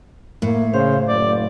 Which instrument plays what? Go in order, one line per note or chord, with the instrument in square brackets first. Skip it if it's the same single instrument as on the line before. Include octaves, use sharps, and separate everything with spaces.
[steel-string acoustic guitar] A2 [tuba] A#3
[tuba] C#3 [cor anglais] C5 [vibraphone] F5
[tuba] F#1 [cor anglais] D5